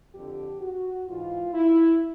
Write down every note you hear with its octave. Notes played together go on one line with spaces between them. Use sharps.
F2 D3 G4
F#4
G#2 E3 F4
E4